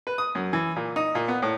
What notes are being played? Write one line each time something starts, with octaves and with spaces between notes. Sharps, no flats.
B4
D#6
F#2
E3
A#2
D#4
A#2
B3
A2